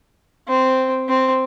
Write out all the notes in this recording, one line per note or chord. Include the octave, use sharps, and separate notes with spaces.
C4
C4